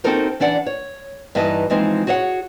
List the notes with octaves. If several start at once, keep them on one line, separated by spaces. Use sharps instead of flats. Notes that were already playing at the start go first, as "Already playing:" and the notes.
C4 D#4 F#4 A4 A#4 C5
E3 D4 D5 F#5
C#5
G2 E3 D#4 B4 D#5 A5
E3 F3 G#3 C4 D#4
F#4 G#4 C#5 D#5 F#5